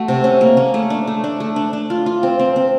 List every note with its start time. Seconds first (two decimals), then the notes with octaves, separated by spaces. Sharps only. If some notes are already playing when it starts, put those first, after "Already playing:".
Already playing: A3 F#4
0.08 C3
0.24 C#4
0.41 A#3
0.57 C#4
0.74 A3
0.90 D4
1.07 A3
1.24 D4
1.40 A3
1.56 D4
1.73 D4
1.90 F4
2.06 F4
2.23 C4
2.39 C4
2.56 C4